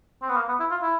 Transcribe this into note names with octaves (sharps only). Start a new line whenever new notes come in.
C4
B3
A#3
B3
E4
F4
E4